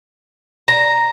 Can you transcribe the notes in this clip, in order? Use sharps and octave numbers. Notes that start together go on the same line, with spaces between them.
A#5